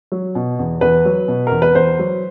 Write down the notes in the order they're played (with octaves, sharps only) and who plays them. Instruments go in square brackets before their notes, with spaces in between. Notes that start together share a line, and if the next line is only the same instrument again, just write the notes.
[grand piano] F#3
B2
E2
E2 B4
F#3
B2
E2 A#4
B4
E2 C5
F#3